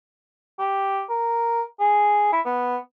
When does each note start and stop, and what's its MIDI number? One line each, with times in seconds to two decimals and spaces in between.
0.59 1.03 67
1.10 1.62 70
1.80 2.29 68
2.33 2.40 64
2.46 2.77 59